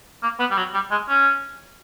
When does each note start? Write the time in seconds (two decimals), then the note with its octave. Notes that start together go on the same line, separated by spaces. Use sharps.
0.23 A#3
0.40 B3
0.51 G3
0.58 F#3
0.74 G3
0.91 G#3
1.09 C#4